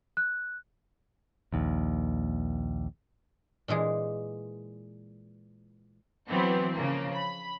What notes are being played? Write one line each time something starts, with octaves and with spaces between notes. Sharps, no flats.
F#6
A#1 D#2
A#2 E3 G#3 G#4
E3 F#3 B3 C4
C#3 F3 A#3
B5